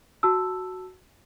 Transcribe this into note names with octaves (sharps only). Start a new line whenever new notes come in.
F#4 A5 E6